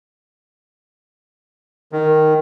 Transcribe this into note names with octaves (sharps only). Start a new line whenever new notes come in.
D#3